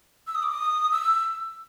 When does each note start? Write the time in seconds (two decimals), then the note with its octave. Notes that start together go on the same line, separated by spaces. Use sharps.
0.27 E6
0.35 D#6
0.43 D6
0.51 D#6
0.92 E6